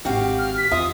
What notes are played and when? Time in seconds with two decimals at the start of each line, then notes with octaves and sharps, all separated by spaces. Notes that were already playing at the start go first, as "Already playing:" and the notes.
0.05 G#1 C4 F#4 G4 F5
0.39 F6
0.57 B6
0.71 E2 F4 E5 D#6